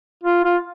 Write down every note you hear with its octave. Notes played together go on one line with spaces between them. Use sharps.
F4
F4